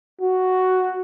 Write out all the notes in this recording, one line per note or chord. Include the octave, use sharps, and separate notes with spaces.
F#4